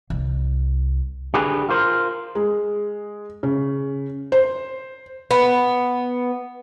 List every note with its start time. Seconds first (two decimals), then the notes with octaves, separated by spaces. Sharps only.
0.10 C2
1.34 D3 G4 G#4 B4
1.69 F4 A#4 C5
2.35 G#3
3.43 C#3
4.32 C5
5.31 B3